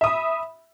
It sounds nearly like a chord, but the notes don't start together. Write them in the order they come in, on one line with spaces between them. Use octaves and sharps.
E5 D#6 B5